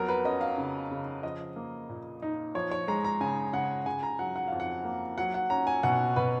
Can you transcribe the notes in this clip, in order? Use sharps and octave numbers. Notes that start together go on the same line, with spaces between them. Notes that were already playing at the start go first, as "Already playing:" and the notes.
Already playing: F2 F#3 B3 A#4
B4
C#4 D#5
F5
C#3
C#3
F3 D#5
A#3
A#2
D#4
F3 C#5
C#5
G#3 A#5
A#5
C#3 G#5
C#3 F#5
C#3 G#5
A#5
F#3 F#5
F#5
F2 F5
F#5
A#3
F#3 F#5
F#5
C#4 A#5
G#5
B2 F#5
B2 B4